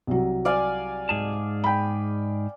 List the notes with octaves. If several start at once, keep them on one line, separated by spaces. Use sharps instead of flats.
C2 F#3
D5 F5 G#5
G#2 G#4 A5
G5 B5